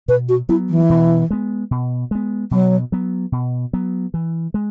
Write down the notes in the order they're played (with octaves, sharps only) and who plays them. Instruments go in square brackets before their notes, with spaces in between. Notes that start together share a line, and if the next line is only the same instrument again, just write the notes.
[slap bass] B2 [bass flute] B4
[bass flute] F#4
[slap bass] F#3 B3 [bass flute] E4
[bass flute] E3
[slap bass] B2
G#3 B3
B2
G#3 B3
[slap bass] B2 [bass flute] F#3
[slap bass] F#3 B3
B2
F#3 B3
E3
G#3